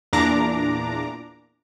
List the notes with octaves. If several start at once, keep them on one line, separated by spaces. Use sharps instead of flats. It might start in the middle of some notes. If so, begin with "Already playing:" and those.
E2 A#2 D4 A#5 D6